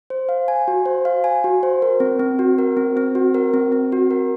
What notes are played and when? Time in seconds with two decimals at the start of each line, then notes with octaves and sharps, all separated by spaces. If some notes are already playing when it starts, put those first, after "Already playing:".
0.10 C5
0.29 F5
0.48 G#5
0.68 F#4
0.86 C5
1.05 F5
1.24 G#5
1.44 F#4
1.63 C5
1.82 A#4
2.00 C4
2.19 C4
2.39 F#4
2.58 A#4
2.77 C4
2.97 C4
3.15 F#4
3.34 A#4
3.54 C4
3.72 C4
3.92 F#4
4.11 A#4